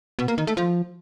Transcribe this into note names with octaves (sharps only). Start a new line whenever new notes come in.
B2
A#3
D#3
A3
F3